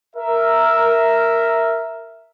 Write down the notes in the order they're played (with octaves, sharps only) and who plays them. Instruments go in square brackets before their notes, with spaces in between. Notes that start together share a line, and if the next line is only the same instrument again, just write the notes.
[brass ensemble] A#4 E5